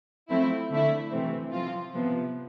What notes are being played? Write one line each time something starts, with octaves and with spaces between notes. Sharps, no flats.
F3 A3 C4 E4
D3 A3 E4
C3 E3 A3 C4
F3 C4 F4
C3 F3 B3